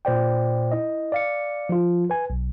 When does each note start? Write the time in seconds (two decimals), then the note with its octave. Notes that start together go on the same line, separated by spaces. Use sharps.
0.05 A#2 C5 D5 G5
0.72 E4 D#5
1.12 D5 F5 C#7
1.69 F3 F4
2.10 B4 G#5
2.30 B1